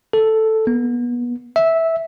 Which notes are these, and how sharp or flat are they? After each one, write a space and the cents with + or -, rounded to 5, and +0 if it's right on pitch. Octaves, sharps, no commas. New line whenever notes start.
A4 +0
B3 -30
E5 -10